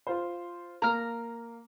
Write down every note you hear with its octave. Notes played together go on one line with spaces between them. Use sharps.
F4 C5
A#3 A#5 F6